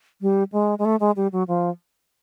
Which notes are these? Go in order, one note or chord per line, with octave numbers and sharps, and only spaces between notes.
G3
G#3
G#3
A3
G#3
G3
F#3
F3